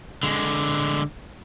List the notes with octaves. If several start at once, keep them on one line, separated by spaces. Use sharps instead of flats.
D3 G#3